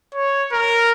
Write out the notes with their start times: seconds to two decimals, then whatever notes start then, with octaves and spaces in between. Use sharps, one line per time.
0.15 C#5
0.52 A#4